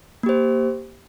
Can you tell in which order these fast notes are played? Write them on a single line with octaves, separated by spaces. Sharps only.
A#3 G4 C5